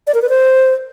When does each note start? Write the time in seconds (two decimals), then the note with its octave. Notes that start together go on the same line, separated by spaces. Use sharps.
0.07 D5
0.14 A#4
0.22 B4
0.29 C5